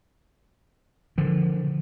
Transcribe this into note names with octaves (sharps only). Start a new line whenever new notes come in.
D3 F3